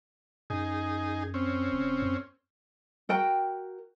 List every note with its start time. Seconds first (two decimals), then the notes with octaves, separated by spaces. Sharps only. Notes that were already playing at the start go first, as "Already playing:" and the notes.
0.50 F#2 D#4 G#4
1.34 C4 C#4
1.73 F1
2.02 F#2
3.09 F#4 A#4 G5